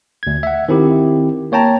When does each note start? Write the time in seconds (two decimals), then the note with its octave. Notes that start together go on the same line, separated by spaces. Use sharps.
0.23 D2 G#6
0.43 E5 F#5
0.68 D#3 C4 E4 G4
1.52 A#3 C#5 G5 A5 A#5